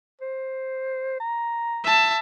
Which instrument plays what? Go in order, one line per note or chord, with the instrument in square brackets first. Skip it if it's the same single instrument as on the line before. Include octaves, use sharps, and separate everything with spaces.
[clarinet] C5
A#5
[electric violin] E5 A5